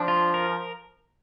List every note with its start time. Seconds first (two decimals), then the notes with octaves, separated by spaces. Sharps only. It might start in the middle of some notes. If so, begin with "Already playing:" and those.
Already playing: F3 D4
0.08 F4
0.34 A#4